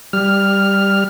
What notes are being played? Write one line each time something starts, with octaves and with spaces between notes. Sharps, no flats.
G3 F6